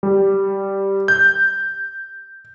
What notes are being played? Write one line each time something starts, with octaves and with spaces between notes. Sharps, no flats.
G3
G6